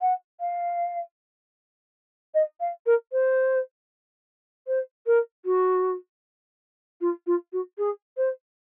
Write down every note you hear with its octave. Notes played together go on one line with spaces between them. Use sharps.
F#5
F5
D#5
F5
A#4
C5
C5
A#4
F#4
F4
F4
F#4
G#4
C5